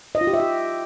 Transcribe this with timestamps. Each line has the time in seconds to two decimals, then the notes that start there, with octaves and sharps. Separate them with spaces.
0.15 D#5
0.21 F4
0.27 G4
0.34 E5
0.40 G4